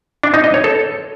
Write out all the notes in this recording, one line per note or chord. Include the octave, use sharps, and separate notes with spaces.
D4
D#4
D#5
C#5
A4